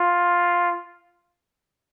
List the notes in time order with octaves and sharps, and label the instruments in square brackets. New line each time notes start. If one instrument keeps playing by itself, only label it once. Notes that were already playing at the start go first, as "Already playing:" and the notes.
Already playing: [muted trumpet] F4